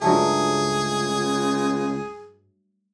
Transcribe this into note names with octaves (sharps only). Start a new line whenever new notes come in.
C#2 G2 F#3 A3 G#4